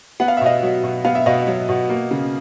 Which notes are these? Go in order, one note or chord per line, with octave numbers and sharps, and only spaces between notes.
B3 F#5
F5
E5
B2 D#5 F5
F#3
B2
B3 F5
E5
B2 D#5 F5
F#3
B2
A#3
C#3